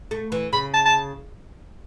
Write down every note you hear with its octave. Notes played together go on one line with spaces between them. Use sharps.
A3
E3
C#3 B5
A5
A5